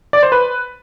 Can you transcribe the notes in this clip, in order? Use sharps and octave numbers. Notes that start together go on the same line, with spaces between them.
D5
C5
B4